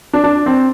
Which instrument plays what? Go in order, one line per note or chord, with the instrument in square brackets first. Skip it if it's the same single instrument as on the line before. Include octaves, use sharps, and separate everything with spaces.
[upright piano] D4
D4
C4